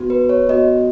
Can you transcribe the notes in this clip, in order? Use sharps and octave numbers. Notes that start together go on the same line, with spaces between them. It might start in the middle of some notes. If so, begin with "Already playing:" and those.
Already playing: B3 F#4
B4
C#5
B3 F#4 D#5